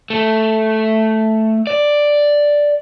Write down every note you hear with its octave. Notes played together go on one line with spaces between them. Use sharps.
A3
D5